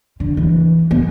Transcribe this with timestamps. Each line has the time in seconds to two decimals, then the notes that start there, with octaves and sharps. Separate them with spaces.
0.20 D3
0.37 E3
0.91 B3